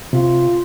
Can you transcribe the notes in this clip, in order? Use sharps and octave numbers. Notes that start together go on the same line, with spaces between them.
C3 F4